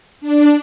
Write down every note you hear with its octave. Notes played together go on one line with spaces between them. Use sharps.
D4